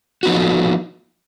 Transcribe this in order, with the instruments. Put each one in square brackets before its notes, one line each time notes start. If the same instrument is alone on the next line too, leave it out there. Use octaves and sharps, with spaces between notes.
[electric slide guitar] F3 B3 D#4 F#4